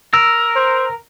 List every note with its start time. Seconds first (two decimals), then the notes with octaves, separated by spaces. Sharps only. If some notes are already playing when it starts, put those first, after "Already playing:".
0.14 A#4 E6
0.56 C5